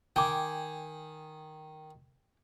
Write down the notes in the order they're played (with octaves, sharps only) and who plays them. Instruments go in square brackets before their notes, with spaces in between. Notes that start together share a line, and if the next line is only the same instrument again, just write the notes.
[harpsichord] D#3 [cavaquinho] G5 G#5 D6